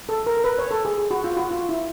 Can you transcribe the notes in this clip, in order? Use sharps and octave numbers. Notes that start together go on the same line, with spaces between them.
A4
A#4
A#4
B4
C#5
A4
G#4
G#4
F#4
F4
F#4
F4
E4